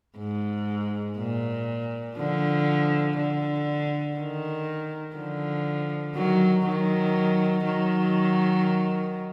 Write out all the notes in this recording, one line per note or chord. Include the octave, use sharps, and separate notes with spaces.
G#2
A#2
D3 F3
D3
D#3
D3 F3
D#3 F#3
D#3 F#3
D#3 F#3